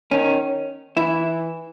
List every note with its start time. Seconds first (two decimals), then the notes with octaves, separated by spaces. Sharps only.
0.11 D#3 C#4
0.97 E3 E4